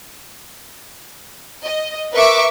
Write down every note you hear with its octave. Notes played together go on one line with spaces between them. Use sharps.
D#5
A#4 B4 E5 C#6 D6